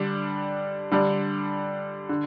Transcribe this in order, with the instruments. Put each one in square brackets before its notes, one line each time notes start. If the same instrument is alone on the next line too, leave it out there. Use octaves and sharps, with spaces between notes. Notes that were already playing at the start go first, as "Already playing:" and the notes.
Already playing: [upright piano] D3 G3 D4
D3 G3 D4
D3